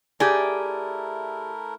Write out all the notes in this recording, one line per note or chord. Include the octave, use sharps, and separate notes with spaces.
A3 E4 G4 G#4 A#4 D5 G#5